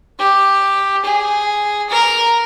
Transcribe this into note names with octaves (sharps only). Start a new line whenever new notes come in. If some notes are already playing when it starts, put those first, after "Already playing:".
G4
G#4
A#4